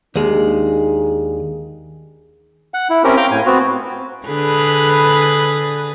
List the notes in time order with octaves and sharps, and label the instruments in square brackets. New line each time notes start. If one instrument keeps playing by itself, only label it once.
[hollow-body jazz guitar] D#2 G#3 [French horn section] D4 D#4 G#4
[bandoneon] F#5
E4
C4 C#4 G4 A#4
F5 G5 A#5 C6 F6
A2 G#5
B3 C4 F#4
[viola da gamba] D3 G#4 B4